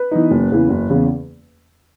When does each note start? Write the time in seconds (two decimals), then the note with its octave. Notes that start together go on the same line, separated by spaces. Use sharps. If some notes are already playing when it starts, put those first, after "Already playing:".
Already playing: B4
0.11 E3 B3 D#4
0.31 F#1
0.51 E2 C#3 E3
0.69 F#1
0.90 E2 C#3 E3